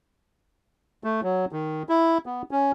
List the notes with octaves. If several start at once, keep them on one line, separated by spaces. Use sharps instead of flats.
A3
F#3
D#3
E4
B3
C#4